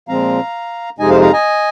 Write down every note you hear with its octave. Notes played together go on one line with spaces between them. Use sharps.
A#2 F3 G#3 C4 F5 A#5
F2 C3 G#3 D#4 D#5 G#5
C5 F5
F5 A#5
D#5 G#5